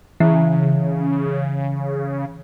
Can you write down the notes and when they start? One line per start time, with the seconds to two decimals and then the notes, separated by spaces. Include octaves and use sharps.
0.20 C#3 E3